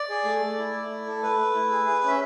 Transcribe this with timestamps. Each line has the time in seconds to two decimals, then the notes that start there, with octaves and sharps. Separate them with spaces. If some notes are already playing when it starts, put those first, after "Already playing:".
Already playing: D5
0.09 G#4
0.25 A3
0.41 A3
0.58 E4
0.73 A3
0.90 E4
1.07 A4
1.23 A3 B4
1.38 A3
1.54 E4
1.71 G#4
1.87 G#4
2.04 C#4 E5